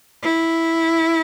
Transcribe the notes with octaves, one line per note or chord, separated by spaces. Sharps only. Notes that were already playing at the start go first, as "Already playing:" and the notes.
E4